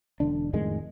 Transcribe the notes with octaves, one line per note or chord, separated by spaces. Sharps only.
E1 D3 D4
F2 A2 D#3 G#3